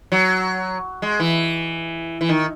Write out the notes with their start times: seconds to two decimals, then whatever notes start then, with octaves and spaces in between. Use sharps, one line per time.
0.12 F#3
1.02 G#3
1.20 E3
2.21 E3
2.29 D#3